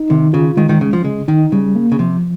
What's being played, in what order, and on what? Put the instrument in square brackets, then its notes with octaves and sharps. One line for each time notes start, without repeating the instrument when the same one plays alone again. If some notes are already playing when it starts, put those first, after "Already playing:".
Already playing: [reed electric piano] D#4
[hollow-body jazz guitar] C3 [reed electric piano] D#3
[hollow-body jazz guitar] C#3 [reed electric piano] F4
[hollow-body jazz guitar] D#3 [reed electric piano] G#3
[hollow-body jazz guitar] D#3
[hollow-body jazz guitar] C#3 [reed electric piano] C#4
[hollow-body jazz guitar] F3
[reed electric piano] C#3 [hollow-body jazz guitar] G#3
[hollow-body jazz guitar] D#3 [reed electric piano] D#4
[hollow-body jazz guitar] C#3 [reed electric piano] G3
[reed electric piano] A#3
[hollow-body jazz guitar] C#3
[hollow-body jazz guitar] C3 [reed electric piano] F3